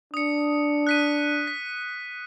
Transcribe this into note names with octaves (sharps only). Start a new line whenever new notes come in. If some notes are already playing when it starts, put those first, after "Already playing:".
D4 D#6 C#7
F#6 B6 D#7
B6